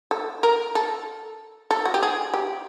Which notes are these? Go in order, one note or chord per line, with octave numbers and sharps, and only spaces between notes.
A4
A#4
A4
A4
F#4
G4
G#4
G4